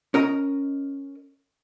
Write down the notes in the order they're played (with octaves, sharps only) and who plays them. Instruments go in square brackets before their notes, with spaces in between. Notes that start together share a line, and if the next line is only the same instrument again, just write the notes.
[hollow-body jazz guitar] C#4 A#4 D#5 A#5